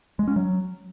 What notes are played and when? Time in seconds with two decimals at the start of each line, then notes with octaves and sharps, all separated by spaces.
0.19 G#3
0.28 C#4
0.36 F#3